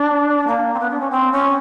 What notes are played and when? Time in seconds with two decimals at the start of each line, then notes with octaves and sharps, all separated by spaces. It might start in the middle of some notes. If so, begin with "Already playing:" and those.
Already playing: D4
0.47 A#3
0.74 C4
0.80 B3
0.90 D4
1.00 C#4
1.11 C4
1.32 C#4